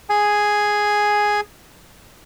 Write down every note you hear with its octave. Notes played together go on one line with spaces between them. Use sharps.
G#4 G#5